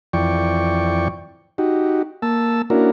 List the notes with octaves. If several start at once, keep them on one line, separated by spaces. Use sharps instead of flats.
F2 E3 D5 G5 C#6
D#4 F#4 G4
A#3 A5 E6
A#3 C#4 D4 E4 F#4 A#4